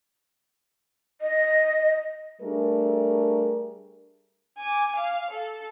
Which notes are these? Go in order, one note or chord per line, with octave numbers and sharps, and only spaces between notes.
D#5
G3 A3 D4 G#4 A#4
G#5 D6
F5
A4